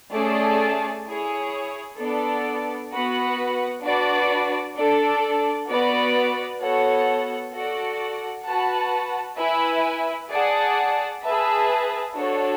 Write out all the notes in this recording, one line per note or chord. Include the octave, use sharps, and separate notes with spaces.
A3 C#4 G#4 D5 A5
E4 G#4 C#5
B3 D4 A4 D5
B3 F#4 B4 F#5
D4 F#4 B4 D5
D4 A4 D5
B3 F#4 B4 D5
B3 F#4 A4 C#5 F#5
F#4 A4 D5 F#5
F#4 B4 F#5 A5
E4 B4 E5 G#5
G#4 D5 F#5 A5
G#4 B4 E5 A5
D4 F#4 A4 C#5